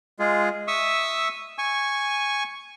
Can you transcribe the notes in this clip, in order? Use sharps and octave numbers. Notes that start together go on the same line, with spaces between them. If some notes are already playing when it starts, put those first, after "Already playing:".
G#3 F4 G#4
E5 C#6 D#6 E6
G#5 C#6